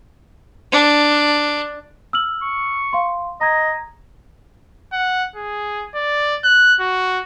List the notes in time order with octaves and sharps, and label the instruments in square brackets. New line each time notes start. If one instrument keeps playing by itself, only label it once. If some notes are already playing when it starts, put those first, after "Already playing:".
[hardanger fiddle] D4
[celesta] E6 F6 F#7
[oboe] C#6
[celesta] F5 C6
[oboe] D#5 [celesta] A#5 G#6
[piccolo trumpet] F#5
G#4
D5
F#6
F#4